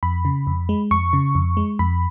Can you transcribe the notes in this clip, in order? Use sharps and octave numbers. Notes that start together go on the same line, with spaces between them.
F2 B5
C#3
F2
G#3
F2 C#6
C#3
F2
G#3
F2 B5